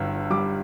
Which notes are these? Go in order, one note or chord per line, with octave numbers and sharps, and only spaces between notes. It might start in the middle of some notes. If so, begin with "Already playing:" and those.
Already playing: G1 G2 E6
G3 D6